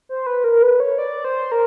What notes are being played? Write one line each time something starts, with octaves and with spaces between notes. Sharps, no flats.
C5
B4
A#4
B4
C#5
D5
C5
A#4